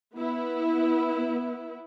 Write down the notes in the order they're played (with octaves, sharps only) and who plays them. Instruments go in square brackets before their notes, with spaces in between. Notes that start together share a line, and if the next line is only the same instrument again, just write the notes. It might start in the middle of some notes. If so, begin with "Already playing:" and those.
[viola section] B3 E4